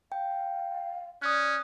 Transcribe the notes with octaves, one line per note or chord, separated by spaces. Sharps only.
F5 G5
C#4 D5 D#6 F#6